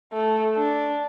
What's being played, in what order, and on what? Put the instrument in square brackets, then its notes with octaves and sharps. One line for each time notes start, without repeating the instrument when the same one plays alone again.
[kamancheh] A3
D4